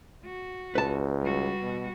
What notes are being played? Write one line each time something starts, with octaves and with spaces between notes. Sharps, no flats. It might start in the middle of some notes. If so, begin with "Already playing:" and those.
F#4
C#2 B4 A5
G3 F#4
B2